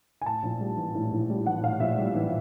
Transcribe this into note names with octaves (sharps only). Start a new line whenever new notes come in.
G#5
A2 A5
A#1
G3
E3
A2
A#1
G3
E3 F#5
A2 F5
A#1 E5
G3
E3